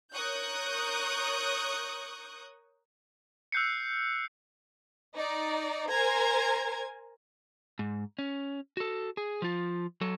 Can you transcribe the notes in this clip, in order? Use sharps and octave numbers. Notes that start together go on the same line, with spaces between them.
A#4 C#5 C#6 D#6 F#6 G6
E6 F#6 G6 C7 C#7
D#4 D5
A#4 C5 G#5 A#5 G#6
G#2
C#4
F#4 A4
G#4
F3 F4
F#3 A4